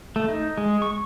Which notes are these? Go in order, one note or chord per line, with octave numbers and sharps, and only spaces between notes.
A3
D#4
G#3
C#6